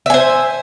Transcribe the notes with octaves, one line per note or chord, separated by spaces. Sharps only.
C5 E5 G#5